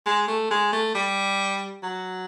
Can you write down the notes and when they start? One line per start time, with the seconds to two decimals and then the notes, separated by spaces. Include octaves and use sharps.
0.06 G#3
0.28 A3
0.50 G#3
0.73 A3
0.95 G3
1.83 F#3